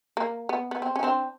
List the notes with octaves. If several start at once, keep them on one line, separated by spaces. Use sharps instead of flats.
A#3
B3
B3
C4
C#4
C4 D4